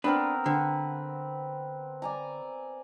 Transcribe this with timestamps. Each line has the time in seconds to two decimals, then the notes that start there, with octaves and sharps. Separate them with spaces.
0.04 B3 C4 D4 A#4 B4
0.46 D3 C4 B4
2.02 D5 G#5 A#5